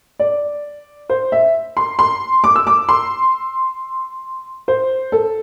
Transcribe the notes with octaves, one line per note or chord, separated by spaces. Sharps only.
D5
C5
E5
C6
C6
D6
E6
D6
C6
C5
A4